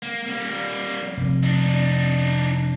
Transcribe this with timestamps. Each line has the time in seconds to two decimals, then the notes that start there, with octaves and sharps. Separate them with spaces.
0.03 A#3
0.26 G3 A#3
1.17 F1
1.43 D4 D#4